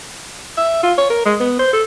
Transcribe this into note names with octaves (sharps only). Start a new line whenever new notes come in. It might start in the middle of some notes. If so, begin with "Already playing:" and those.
E5
F4
C#5
A#4
G#3
B3
C5
A4